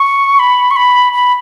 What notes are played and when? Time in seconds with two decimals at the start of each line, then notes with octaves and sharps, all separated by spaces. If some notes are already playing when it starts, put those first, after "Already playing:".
Already playing: C#6
0.39 B5
0.71 C#6
0.76 B5
1.13 B5